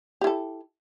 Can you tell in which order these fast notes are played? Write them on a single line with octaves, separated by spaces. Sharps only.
G4 E4 A4